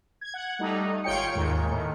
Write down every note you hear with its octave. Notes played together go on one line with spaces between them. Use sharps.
G#6
F#5
G3 A3 D#4
G#1 F4 C#5 G5 C#7
D#2 G#2 D#3
A2 D#3